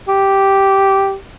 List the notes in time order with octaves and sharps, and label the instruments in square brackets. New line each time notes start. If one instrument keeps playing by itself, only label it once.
[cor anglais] G4